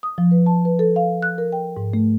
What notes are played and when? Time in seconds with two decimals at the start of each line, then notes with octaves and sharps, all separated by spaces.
0.03 D#6
0.18 F3
0.31 B4
0.46 A5
0.65 B4
0.79 A4
0.96 F5
1.22 F#6
1.38 A#4
1.52 G5
1.77 G#2
1.94 A3